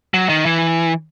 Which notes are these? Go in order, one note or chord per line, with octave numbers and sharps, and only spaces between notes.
F#3
D#3
E3